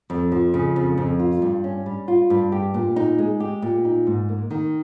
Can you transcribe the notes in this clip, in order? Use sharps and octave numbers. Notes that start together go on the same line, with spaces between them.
F2
F3
C#3
F2
F2
F4
G2
C#4
G3
F4
G2
G4
A#2
D#4
G#3
G4
A#2
D#4
G#2
A#3
D#3